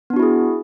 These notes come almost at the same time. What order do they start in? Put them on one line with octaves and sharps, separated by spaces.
B3 D4 F#4 E4 G#4